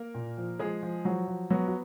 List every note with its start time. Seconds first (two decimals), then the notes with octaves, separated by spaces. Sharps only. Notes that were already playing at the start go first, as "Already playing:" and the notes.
Already playing: A#3 A#4
0.15 A#2
0.38 F3
0.59 F3 G#3 G#4
0.83 F3
1.05 F3 F#3 F#4
1.28 F3
1.50 F#3 B3 F#4
1.68 F#4